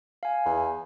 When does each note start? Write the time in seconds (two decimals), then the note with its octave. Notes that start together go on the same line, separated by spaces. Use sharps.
0.23 F5 G#5
0.46 E2